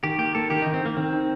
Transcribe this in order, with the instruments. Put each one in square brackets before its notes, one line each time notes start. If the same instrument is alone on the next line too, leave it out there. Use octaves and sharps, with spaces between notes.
[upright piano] D#3 [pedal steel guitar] G4
[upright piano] A#3 [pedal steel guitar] G4
[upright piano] A#3 [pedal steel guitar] A4
[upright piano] D#3 [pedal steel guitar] G4
[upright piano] D#3 [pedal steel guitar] D#4
[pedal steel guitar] C4
[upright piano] D#3 [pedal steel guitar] A#3
[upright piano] D#3 [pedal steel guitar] C4
[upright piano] D#4